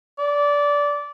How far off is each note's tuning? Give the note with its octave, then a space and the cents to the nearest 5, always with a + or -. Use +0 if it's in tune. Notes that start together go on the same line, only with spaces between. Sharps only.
D5 -20